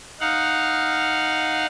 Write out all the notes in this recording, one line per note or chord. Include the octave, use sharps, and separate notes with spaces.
D#4 F5 F#5